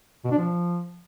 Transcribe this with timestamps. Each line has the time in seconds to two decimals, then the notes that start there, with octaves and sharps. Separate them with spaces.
0.25 B2
0.31 D4
0.38 F3